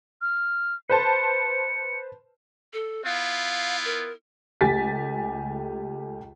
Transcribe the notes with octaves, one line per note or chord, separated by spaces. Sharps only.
F6
B4 C5 A5 C#7
A4
B3 E4 F4 F5
A#4
C#2 A3 G4 G#5 A6 B6